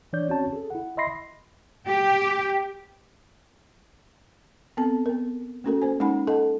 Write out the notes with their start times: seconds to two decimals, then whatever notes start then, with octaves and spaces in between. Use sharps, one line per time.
0.13 E3 D4 C#5 D5 G6
0.28 C4 C#4 F#4 C#5 A5
0.53 G#4 A4
0.70 E4 F#5
0.97 D#5 E5 B5 C6 A#6 C7
1.87 G4
4.77 B3 C4 A4 A5
5.06 B3 A#4
5.64 A3 A#3 C#4 F#4 A4 A#4
5.82 A#3 C5 G#5
6.00 G#3 C#4 D#4 F#5 G#5 B5
6.27 A4 D#5 F#5 A5